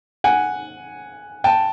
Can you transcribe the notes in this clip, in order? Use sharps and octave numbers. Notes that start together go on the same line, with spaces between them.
F#5 G#5
G5 A5